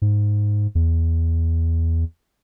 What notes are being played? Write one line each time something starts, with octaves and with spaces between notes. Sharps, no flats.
G#2
E2